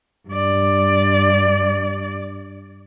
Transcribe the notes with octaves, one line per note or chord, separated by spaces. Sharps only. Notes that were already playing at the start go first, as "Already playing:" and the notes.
G2 D5